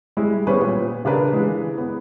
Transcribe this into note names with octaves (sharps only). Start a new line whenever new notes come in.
G3 G#3 E4
G3 B3 C#4 G#4 B4 C5
A#2
C#3 D4 A#4 B4
E3 G#3
B3